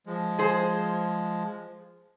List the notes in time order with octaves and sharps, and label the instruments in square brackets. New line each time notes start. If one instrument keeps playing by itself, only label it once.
[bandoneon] F3 G#3
[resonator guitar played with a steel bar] G#4 C5